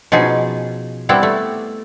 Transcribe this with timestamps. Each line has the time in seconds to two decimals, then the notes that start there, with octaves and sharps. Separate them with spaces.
0.12 B2 F3 C#4 D#4 G#4
1.09 G3 B3 C4 E4
1.23 A3